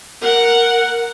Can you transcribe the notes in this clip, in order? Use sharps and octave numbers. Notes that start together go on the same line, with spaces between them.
A#4 F#5